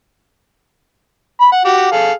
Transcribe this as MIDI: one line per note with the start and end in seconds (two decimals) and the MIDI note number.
1.40 1.47 83
1.52 1.64 78
1.65 1.89 66
1.65 1.89 67
1.92 2.12 68
1.92 2.12 69
1.92 2.12 77